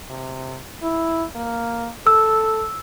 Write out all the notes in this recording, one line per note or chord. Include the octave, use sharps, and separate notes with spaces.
C3
E4
A#3
A4 E6